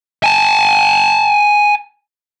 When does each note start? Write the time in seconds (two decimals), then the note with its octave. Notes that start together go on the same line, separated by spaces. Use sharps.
0.24 G#5 A5